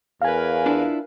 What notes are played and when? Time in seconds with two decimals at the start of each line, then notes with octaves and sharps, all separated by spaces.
0.22 E2 A#4 B4 F5 G#5
0.66 D4 E4 F4